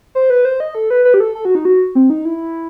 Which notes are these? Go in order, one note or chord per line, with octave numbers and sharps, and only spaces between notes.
C5
B4
C5
D#5
A4
B4
B4
G4
A4
A4
F#4
D#4
F#4
C4
D#4
E4